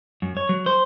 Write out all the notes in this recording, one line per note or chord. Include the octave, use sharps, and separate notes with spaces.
F#2
C#5
F#3
C5